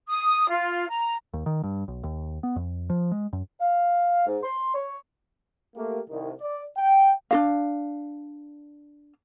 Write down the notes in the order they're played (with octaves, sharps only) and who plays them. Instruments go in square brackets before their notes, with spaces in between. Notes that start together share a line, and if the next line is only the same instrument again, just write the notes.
[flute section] D#6
F4
A#5
[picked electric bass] D#2
D#3
G2
B1
D#2
B3
F2
F3
G#3
F#2
[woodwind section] F5
G#2
C6
C#5
[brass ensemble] A3 A#3 G4
C2 D#3
D5
G5
[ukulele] D4 F#4 F5